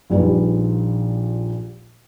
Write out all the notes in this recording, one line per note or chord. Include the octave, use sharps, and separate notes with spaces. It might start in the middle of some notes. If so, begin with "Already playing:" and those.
A#1 A#2 G3 D#4 B4